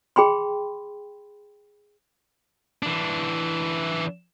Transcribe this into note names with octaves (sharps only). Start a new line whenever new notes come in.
G#4 G5 B5 C6
E3 D4